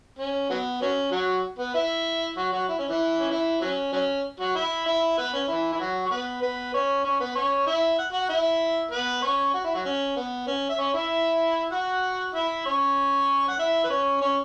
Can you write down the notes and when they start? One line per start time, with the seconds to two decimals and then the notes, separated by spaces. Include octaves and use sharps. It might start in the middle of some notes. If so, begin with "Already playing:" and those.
0.19 C#4
0.50 F#3 B3
0.81 F#3 C#4
1.12 F#3 F#4
1.59 B3 B4
1.74 E4 E5
2.37 F#3 F#4
2.52 F#3 F#4
2.69 E4
2.79 C#4
2.88 E3 E4
3.20 C#4
3.30 E3 E4
3.61 F#3 C#4
3.93 F#3 C#4
4.40 F#3 F#4
4.55 E4 E5
4.86 E4 E5
5.17 B3 B4
5.33 C#4
5.48 E3 E4
5.72 E4
5.80 F#3 F#4
6.06 C#5
6.11 B3 B4
6.42 B3 B4
6.74 C#4 C#5
7.05 C#4 C#5
7.20 B3 B4
7.35 C#4 C#5
7.67 E4 E5
7.98 F#5
8.12 F#4 F#5
8.29 E4 E5
8.91 B3 B4
9.22 C#4 C#5
9.54 F#4
9.64 E4
9.74 F#3 F#4
9.85 C#4
10.16 B3
10.47 C#4
10.69 E5
10.78 C#4 C#5
10.94 E4 E5
11.72 F#4 F#5
12.34 E4 E5
12.65 C#4 C#5
13.49 F#5
13.59 E4 E5
13.84 B4
13.90 C#4 C#5
14.21 C#4 C#5